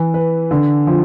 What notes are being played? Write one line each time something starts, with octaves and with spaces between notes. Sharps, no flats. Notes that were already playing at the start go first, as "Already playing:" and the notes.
Already playing: E3
B4
D3
F3